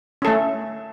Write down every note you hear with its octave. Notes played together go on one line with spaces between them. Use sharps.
A3 C#4 A4